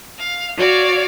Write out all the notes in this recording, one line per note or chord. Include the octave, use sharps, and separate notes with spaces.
F5
F#4 C#5 D5 F5